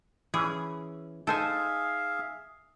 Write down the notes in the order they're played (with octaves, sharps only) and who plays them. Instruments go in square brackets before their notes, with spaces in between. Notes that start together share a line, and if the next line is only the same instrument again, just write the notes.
[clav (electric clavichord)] E3 C#4 [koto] G#4
[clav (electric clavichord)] D#4 [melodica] G#4 E5 F5 [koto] A4 C5 G#5